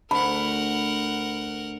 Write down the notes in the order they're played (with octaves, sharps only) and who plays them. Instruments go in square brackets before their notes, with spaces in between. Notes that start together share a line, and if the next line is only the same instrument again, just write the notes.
[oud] D2 [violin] A#4 F#5 [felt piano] B5